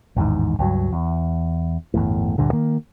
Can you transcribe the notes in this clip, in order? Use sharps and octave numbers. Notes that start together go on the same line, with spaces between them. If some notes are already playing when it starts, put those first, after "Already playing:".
A1 E2 G#2 D#3
C#2 G2 F#3
E2
G1 E2 A2
D2 G2 A#2 D3
D#3 A#3